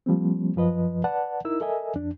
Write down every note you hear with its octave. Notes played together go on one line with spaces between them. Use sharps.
F3 G3 A#3 C4
F#2 F3 B4 D#5
B4 D5 F#5 A5
D#4 E4 A#4 E6
A4 A#4 D#5 E5 G#5
F2 D4